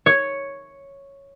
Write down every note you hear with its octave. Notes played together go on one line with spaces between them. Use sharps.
C#5